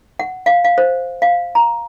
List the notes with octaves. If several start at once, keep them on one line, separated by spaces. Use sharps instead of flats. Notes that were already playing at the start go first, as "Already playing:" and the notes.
F#5
F5
F5
C5
F5
A#5